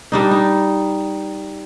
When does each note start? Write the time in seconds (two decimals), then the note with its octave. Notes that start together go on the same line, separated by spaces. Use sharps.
0.12 G3 D4 D#4
0.31 D#4